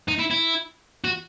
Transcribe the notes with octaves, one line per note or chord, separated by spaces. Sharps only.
D#4
E4
E4
F#4